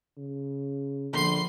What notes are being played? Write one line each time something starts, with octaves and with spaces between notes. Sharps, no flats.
C#3
A#1 D3 B5 C6